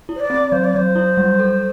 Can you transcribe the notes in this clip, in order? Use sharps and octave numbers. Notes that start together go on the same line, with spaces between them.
E4
C5
D5
C4
F#3 C5
D5
F#3 C5
E4
G3
A4